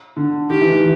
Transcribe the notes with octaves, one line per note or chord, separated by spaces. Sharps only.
D3
D#3 G4
E3
D#3